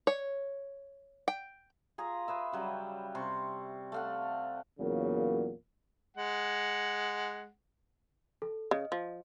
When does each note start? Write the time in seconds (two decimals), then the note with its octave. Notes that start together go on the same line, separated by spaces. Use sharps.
0.07 C#5
1.28 G5
1.98 F4 G#4 A#5
2.28 G#4 B4 E5
2.52 C#3 F#3 G3
3.15 C3 C6 C#6
3.92 A3 F5 F#5
4.80 E2 A#2 C#3 F#3 A#3
6.17 G#3 F#5
8.42 A4
8.71 C#3 D#5
8.92 F3